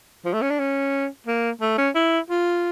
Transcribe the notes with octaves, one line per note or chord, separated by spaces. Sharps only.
F3
A3
C#4
D4
C#4
A#3
A3
C#4
E4
F4